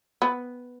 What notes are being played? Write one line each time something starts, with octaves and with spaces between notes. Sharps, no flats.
B3